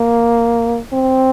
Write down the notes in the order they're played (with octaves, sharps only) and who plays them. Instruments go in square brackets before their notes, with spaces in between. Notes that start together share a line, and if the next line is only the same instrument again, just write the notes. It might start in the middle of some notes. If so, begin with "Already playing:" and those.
Already playing: [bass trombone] A#3
C4